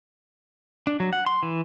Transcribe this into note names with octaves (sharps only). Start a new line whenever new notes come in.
D4
F#3
F#5
C6
E3